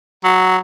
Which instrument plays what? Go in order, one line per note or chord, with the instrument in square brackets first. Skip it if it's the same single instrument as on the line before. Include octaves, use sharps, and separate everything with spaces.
[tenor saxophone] F#3